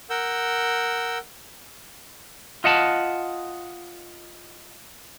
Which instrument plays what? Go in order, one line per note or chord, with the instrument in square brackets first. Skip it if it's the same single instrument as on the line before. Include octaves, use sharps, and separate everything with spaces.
[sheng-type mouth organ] A#4 F#5 E6 G6
[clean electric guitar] F4 D#5 F#5 A5